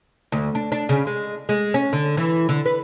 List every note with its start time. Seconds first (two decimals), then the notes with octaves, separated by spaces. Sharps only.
0.32 D2
0.55 D4
0.72 D4
0.89 C#3
1.07 G#3
1.49 G#3
1.74 C#4
1.93 D3
2.17 E3
2.49 D3
2.66 B4